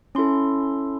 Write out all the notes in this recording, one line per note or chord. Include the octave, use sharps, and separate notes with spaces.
C#4 E4 A4 C6